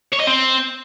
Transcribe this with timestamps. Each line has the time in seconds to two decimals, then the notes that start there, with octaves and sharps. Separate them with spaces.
0.13 C#5
0.20 D#5
0.27 C4